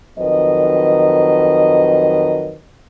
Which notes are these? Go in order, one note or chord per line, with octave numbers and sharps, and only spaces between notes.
F2 D#3 F#3 B4 D#5